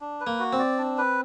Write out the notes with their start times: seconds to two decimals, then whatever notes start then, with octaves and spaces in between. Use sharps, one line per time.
0.01 D4
0.20 B4
0.27 A#3
0.39 F#4
0.53 C4
0.59 D5
0.78 D4
0.98 B4